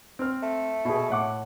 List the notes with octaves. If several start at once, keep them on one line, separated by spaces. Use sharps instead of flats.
C4 F6
A3
B2 G#4
A2 F#5 D6